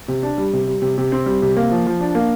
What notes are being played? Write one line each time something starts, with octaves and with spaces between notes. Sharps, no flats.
C3
D4
G3
C3
G3
C3
C3
C4
G3
C3
A#3
F3
F3
D4
A#3